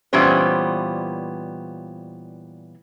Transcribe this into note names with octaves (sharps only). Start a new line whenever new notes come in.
A#2 E3 G3 B3 C#4 C5